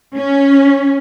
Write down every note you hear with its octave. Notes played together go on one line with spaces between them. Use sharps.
C#4